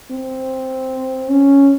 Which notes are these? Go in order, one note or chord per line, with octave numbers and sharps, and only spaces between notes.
C4
C#4